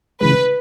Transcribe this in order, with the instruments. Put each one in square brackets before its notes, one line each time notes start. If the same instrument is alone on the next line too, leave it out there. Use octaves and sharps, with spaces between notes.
[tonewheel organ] C#3 E3 G#3 [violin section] B4